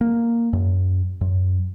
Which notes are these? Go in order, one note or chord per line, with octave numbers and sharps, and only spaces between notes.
A#3
F#2
F#2